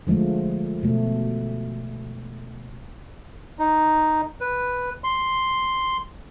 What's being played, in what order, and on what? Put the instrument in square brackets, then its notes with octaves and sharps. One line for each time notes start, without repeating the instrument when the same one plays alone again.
[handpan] D3 F3 G#3 A3
B2 A3
[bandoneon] D#4
B4
C6